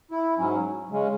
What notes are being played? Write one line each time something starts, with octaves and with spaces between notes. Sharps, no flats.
E4
G#2 F#3 C#4
C#3 G#3 C#4